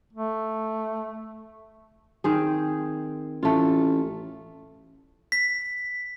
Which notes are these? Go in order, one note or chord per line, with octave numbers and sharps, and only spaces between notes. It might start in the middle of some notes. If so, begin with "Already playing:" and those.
A3
D#3 C4 G#4
A1 A3 F4
B6